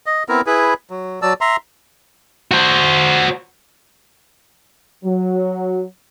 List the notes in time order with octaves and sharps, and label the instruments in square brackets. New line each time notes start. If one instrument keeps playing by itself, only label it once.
[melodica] D#5
B3 C4 E4 A#4
E4 G#4 B4
F#3
F#3 D5 A5 E6
E5 A#5 C6
[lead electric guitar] F#4 C5
[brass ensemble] F#3